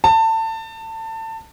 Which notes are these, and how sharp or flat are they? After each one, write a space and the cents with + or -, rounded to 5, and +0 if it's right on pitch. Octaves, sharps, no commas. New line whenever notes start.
A5 +25